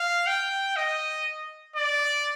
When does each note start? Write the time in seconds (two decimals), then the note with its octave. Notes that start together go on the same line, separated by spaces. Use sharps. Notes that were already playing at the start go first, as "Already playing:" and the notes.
Already playing: F5
0.27 G5
0.76 D#5
1.76 D5